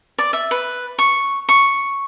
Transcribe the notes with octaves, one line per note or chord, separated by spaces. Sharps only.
D5
E5
B4
C#6
C#6